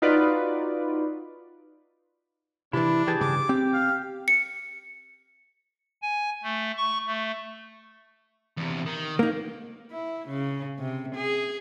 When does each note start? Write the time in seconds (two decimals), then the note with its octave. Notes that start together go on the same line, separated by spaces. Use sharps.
0.02 D#4 F4 F#4 B4 D5
2.73 C3 E3 D4 E4
3.07 E3 G4 G#4 A5
3.21 G2 C#3 D6
3.49 C4 G4
3.73 F5
4.28 C#7
6.02 G#5
6.43 A3
6.77 C#6
7.06 A3
8.57 E2 C3
8.86 D#3
9.19 A#3 D#4
9.92 E4
10.28 C#3
10.79 C3
11.15 G#4